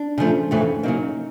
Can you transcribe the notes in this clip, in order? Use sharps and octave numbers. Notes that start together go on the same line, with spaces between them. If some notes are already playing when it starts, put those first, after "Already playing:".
Already playing: D4
C#3 F3 A3
F2 C#3 E3 A3
C#3 F#3 A#3 D#4